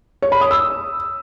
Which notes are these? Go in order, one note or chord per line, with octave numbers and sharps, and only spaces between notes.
C#5
B5
D#6
E6